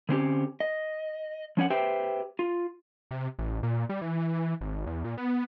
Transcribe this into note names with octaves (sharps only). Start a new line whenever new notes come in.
D3 C4 C#4 G4
D#5
F3 C#4 C#5 F#5
G4 B4 C5 E5 G5
F4
C3
A1
A#2
G3
E3
E3
G#1
E2
A#2
B3